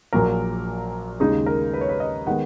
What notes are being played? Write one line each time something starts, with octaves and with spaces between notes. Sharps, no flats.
A#1 A#2 F#3 A#4
D#2 C#3 G#3 D#4 G#4
A#4
B4
C#5
B4
D#5
D#3 G#3 B3 F#5